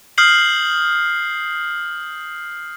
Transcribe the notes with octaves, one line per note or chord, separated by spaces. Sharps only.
D#6 F6 G6 C7 F#7